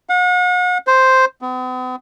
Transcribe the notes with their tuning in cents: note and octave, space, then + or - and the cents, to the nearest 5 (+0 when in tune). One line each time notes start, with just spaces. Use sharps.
F#5 -40
C5 +0
B3 +45